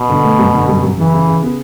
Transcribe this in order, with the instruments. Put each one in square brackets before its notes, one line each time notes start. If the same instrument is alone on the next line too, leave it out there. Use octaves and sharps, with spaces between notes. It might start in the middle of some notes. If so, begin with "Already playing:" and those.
Already playing: [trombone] B2
[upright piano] D3
A3
F#2
D3
F#2
F#2
[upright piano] C#3 [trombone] E3
[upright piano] C#3
C#3
B3